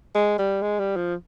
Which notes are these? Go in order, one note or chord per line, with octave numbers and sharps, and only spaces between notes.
G#3
G3
G#3
G3
F3